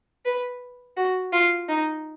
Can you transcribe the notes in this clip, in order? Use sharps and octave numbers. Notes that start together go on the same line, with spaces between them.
B4
F#4
F4
D#4